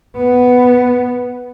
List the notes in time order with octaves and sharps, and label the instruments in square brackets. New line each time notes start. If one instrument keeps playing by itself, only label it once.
[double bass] B3